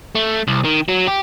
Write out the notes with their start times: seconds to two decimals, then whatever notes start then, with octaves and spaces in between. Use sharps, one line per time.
0.15 A3
0.47 C2
0.64 D#3
0.88 F#3
1.08 G4